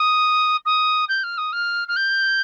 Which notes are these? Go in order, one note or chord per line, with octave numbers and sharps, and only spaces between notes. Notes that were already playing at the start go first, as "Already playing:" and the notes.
Already playing: D#6
D#6
G6
F6
D#6
F6
F6
G6